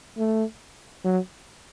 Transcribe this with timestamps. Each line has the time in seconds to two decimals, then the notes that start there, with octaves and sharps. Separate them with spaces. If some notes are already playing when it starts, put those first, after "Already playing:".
0.18 A3
1.05 F#3